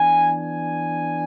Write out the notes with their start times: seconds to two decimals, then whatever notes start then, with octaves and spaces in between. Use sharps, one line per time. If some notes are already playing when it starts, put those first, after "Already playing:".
Already playing: E3 B3 D4 G#5
0.39 G#5